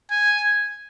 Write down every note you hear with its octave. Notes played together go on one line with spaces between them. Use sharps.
G#5